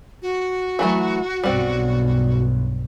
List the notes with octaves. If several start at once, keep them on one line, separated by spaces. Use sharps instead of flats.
F#4
E3 F#3 A3
B1 G2 B2 G3 C4